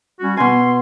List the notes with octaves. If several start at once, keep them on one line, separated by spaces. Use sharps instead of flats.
G3 C#4 F#4
B2 G#5 C6